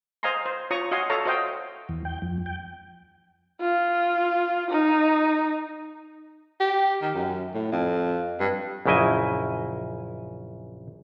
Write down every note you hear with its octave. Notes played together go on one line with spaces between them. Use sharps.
C5 D#5 F5 G#5 A#5 C6
C5
F4 C#5 A#5 C#6 D#6
F#4 D#5 F5 G#5 C6
A4 C#5 E5 F5 A5 A#5
F#4 C5 D#5 F5 G5
E2
G5
F2
G5
F4
D#4
G4
D#3
F#2
A2
F2
G2
A#1 F#2 C#3 E4 D#5 G#5